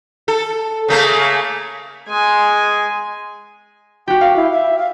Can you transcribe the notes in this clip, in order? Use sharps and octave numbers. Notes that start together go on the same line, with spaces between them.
A4
C#3 A3 A#3
G#3 G#5
F#4 G4 G5
F5
E4
E5
F5